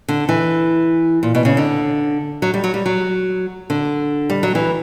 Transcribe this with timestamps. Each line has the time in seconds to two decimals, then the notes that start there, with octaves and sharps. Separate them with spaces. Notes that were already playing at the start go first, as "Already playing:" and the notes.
0.08 D3
0.29 E3
1.23 A#2
1.35 B2
1.45 C#3
1.57 D3
2.42 F#3
2.54 G3
2.64 F#3
2.74 G3
2.86 F#3
3.70 D3
4.30 G3
4.43 F#3
4.55 E3